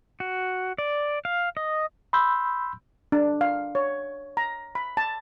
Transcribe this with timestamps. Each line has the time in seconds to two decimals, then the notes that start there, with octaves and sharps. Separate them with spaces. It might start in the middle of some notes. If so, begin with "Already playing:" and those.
0.20 F#4
0.78 D5
1.25 F5
1.57 D#5
2.13 B5 C6 E6 G6
3.12 D4
3.41 F5
3.75 C#5
4.37 A#5
4.75 B5
4.97 A5